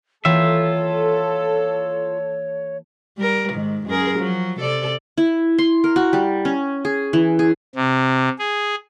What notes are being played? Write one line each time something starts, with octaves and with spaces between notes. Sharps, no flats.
E3 A#3 F4 A4 C#5 E5 G5
G3 A#4
G#2 D#3
F#2 G#4 A#4
F3 F#3
C3 A4 D5
E4
C6
A#4
F#4
G3
C#4
G#4
E3
G#4
C3
G#4